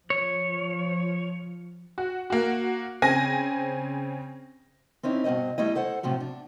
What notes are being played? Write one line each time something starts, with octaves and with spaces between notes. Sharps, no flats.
F3 C#5
F#4
A#3 F#4
C#3 C4 G5 G#5 A#6
C4 C#4 D#4 E4
G2 B2 D#3 C5 D#5
G3 A3 E4 D#5
A4 C5 F#5
A2 C3 F3 F#3
D4